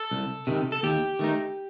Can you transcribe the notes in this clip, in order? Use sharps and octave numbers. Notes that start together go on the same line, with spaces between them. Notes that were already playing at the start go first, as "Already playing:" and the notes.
Already playing: A4
C2
C3 D#3
A4
D#2 G4
D#3 A3 D#4